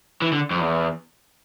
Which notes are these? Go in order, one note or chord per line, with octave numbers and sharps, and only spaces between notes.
E3
D3
F2
E2